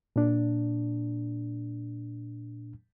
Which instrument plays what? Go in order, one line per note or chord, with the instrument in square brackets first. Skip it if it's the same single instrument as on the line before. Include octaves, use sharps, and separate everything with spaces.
[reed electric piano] A#2 D4